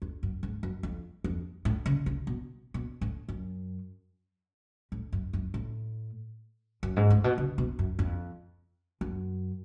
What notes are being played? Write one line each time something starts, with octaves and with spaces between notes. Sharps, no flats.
F2
F#2
G#2
F#2
F2
F2
A2
C#3
C#3
B2
B2
A2
F#2
A2
F#2
F#2
A2
F#2
G#2
A2
B2
C#3
B2
F#2
F2
F#2